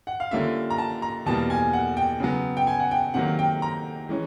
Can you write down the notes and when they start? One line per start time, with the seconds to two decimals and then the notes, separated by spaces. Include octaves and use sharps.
0.07 F#5
0.20 F5
0.31 D3 G3 A#3 C#4 F4 E5
0.70 A#5
0.78 A5
1.02 A#5
1.26 E2 B2 G3 A#3 A5
1.50 G#5
1.73 F#5
1.97 G5
2.20 C#3 F#3 B3
2.57 G5
2.67 G#5
2.80 F#5
2.91 G5
3.14 C3 D#3 F#3 A#3 F#5
3.39 G5
3.62 A#5
4.09 E3 G#3 C#4